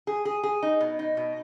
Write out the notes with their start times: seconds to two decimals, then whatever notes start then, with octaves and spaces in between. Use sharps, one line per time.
0.07 G#4
0.25 G#4
0.43 G#4
0.62 D#4
0.81 B2
0.99 D#4
1.17 B2